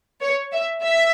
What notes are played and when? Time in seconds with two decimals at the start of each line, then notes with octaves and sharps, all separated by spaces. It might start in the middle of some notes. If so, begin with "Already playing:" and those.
0.22 C#5
0.53 E5
0.83 E5